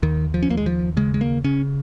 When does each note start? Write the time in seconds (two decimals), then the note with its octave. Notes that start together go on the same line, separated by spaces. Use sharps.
0.03 D#2 D#3
0.34 F3
0.43 C#4
0.49 D#2 A#3
0.57 G#3
0.66 F3
0.97 C#3 G#3
1.14 G#3
1.21 A#3
1.44 C#3 C#4